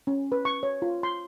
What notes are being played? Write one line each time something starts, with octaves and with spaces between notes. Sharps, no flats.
C#4
B4
C#6
C#5
F4
C6